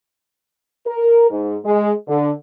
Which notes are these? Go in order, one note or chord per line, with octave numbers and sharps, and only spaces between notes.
A#4
G#2
G#3
D3